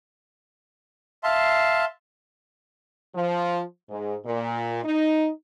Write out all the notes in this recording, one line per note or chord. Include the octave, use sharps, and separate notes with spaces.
E5 F5 A5 C6
F3
G#2
A#2
D#4